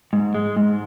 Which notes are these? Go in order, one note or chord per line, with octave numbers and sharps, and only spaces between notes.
G#2
G#3
G#2